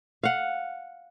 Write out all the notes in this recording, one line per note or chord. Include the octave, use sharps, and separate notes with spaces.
F5 F#5